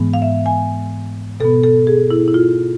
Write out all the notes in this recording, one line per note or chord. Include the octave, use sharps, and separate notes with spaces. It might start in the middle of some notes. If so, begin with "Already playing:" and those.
Already playing: G#2 E3 G#3 B3
F5
E5
G#5
B2 B3 A4
A4
G#4
E4
E4
F4